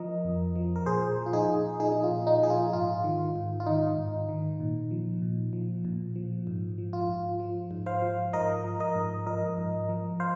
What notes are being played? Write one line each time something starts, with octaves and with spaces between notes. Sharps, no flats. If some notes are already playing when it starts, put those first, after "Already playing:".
Already playing: F3 A#4 D#5
F2
F3
A#4
A#2 G#4 C5
F3
F4
D#4 G#4
A#2
F3 D#4 G#4
D#4
F4
A#2
D#4
F3 G#4
F4
G#2 F4
D#3
G#2
F4
D#3 D#4
G#2
D#3
A#2
F3
A#2
F3
A#2
F3
G#2
F3
F4
G#2
F3
G#2
C5 F5
F3
G#2 A#4 D#5
F3
A#4 D#5
G#2
F3 A#4 D#5
G#2
F3
C5 F5